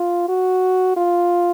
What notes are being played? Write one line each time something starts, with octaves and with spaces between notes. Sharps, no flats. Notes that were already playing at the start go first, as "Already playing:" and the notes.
Already playing: F4
F#4
F4